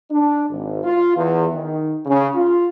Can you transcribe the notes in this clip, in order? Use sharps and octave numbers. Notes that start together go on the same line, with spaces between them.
D4
G#1
F4
E2
D#3
C#3
F4